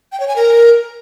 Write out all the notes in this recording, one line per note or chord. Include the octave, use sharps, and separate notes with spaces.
G5
C#5
G#5
A#4